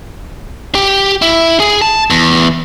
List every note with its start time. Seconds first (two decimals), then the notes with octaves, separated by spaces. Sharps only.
0.75 G4
1.22 E4
1.60 G#4
1.82 A5
2.10 E2